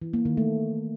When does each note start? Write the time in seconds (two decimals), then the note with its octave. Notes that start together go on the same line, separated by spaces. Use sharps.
0.02 E3
0.13 A#3
0.25 D#3
0.37 A3